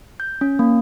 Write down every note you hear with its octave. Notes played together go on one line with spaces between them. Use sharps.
G6
C#4
A#3